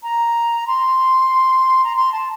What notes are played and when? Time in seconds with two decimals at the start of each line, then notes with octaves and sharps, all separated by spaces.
0.03 A#5
0.67 C6
1.84 A#5
1.96 C6
2.12 A5